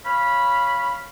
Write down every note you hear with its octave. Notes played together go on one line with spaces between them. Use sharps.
C#5 F5 B5